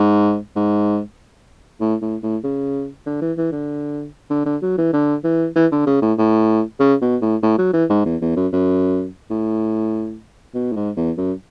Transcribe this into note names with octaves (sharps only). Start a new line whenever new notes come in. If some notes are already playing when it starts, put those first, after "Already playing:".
Already playing: G#2
G#2
A2
A2
A2
C#3
D3
E3
E3
D3
D3
D3
F#3
E3
D3
E3
E3
D3
C#3
A2
A2
C#3
B2
A2
A2
F#3
E3
G#2
E2
E2
F#2
F#2
A2
B2
A2
G#2
E2
F#2